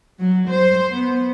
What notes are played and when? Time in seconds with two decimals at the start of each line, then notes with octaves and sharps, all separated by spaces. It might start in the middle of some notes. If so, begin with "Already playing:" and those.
0.20 F#3
0.49 C5
0.91 B3